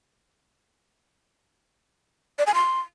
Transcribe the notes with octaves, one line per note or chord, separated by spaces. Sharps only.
D5
G#5
C6